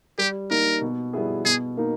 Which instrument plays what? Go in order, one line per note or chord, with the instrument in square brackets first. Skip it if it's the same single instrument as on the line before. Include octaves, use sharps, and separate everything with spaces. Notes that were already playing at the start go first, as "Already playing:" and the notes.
[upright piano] G3 [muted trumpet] G4
[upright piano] A#3 D#4 [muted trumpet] A#4
[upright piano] B2
G3 B3 E4 G#4
[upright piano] B2 [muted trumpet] G#4
[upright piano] A#3 D#4